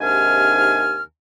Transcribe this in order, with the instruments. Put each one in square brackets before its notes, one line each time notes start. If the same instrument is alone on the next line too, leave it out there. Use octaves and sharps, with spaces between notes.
[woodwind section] D#2 G#2 C3 D4 G#5 F6